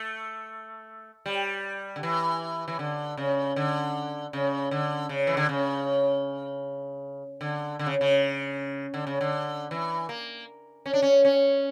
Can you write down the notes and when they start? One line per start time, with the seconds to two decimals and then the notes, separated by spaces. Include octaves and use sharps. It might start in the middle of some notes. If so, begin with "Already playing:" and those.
Already playing: A3
1.26 G3
1.96 D3
2.03 E3
2.68 E3
2.79 D3
3.17 C#3
3.56 D3
4.33 C#3
4.71 D3
5.09 C#3
5.27 E3
5.37 D3
5.49 C#3
7.41 D3
7.79 D3
7.86 C#3
8.01 C#3
8.94 D3
9.07 C#3
9.21 D3
9.71 E3
10.09 A#3
10.86 C#4
10.94 D4
11.02 C#4
11.25 C#4